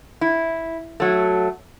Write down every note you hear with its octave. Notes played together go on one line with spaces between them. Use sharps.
E4
F#3 A3